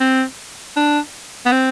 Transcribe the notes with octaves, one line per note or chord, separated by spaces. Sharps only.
C4
D4
B3
C4